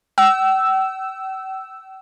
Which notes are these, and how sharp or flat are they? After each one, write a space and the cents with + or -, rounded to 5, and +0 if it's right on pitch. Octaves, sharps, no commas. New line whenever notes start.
G5 -45 E6 +0